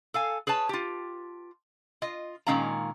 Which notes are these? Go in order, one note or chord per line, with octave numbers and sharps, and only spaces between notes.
A4 F5 G#5
G#4 B4 C#5 A5
F4 G4
F4 D#5
A#2 D#3 G#3 C#4 F5 A#5